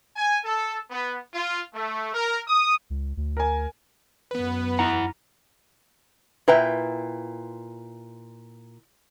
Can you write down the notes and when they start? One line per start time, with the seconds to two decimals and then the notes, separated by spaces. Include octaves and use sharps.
0.16 G#5
0.45 A4
0.90 B3
1.33 F4
1.73 A3
2.14 A#4
2.46 D#6
2.90 C#2
3.17 D2
3.37 A#4 G#5
4.31 F#2 B3 B4
4.79 E4 F#5 A#5
6.48 A#2 E4 B4 E5 G5 A#5